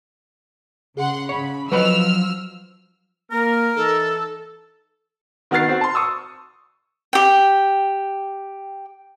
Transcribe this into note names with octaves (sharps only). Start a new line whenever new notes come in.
C#3 G#4 F#5 C6
C#3 C#5 B5
F3 F#3 F#4 B4 D#5 B5 E6 F6
A#3 A#4
E3 D#4 A4
D#3 B3 F#4 F6 A6 C7
C4 F#4
A5 C6
C#6 D#6 E6
G4 G5